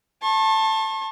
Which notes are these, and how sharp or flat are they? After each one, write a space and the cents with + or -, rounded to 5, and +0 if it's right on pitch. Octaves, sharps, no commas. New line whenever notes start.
A5 +10 C#6 -45